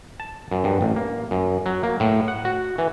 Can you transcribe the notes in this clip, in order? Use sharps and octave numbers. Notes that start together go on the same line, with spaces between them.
A5
F#2
G2
A1
A#3
F#2
F#3
A#3
A2
F#5
F#4
E3